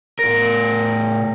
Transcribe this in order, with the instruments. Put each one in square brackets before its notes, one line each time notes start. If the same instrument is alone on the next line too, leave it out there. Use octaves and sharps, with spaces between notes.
[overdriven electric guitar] A2 A#4 [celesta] A#6 D7